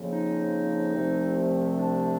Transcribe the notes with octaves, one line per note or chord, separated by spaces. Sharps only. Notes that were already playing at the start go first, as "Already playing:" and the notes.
Already playing: F2 C#3 F3 A#3
D#4
C2 C3 F3 A3 C4
D4